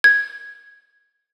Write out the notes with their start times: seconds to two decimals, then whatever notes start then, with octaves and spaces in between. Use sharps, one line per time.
0.04 G#6